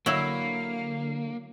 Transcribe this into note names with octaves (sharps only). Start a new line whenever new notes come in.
D3 F#3 A#3 E4 F5